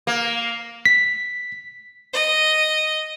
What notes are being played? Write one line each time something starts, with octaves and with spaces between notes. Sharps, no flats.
A#3
B6
D#5